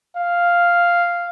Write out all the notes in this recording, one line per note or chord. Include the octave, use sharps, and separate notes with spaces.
F5